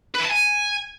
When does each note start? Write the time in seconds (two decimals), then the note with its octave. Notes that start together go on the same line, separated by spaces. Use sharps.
0.14 B4
0.20 E4
0.25 A5
0.30 G#5